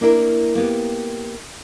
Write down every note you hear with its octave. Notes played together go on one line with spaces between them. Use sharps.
A#3 D4 E4 A4 A#4
A#3 B3 G4